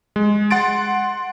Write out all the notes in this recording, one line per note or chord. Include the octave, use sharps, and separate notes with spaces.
G#3
F#5 C6 A6 D7